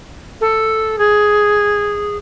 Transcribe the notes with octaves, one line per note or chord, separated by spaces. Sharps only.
A4
G#4